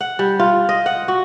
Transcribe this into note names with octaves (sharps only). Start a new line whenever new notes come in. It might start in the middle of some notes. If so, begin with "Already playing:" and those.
F#5
G3
F4
D#5
F#5
F#4